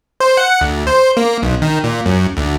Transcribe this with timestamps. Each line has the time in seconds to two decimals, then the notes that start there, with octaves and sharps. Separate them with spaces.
0.20 C5
0.37 F#5
0.61 D2
0.87 C5
1.17 A#3
1.42 B1
1.62 D#3
1.84 A#2
2.06 F#2
2.37 D2